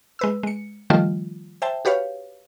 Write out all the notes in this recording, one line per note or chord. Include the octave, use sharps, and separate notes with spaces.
G#3 B4 E6
G#3 C#7
D#3 F3 G3 A3 F4
C5 E5 G5 A5
F#4 G4 B4 C#5 F5